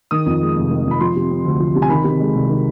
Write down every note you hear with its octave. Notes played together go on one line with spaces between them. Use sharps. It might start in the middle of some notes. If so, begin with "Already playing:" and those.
D#3 D#6
F2
G#3
F1
D#3
F2
B5
F3 C6
C3
C4
D2
F3
C3
G#5
D#3 B5
C3
G#3
C2
D#3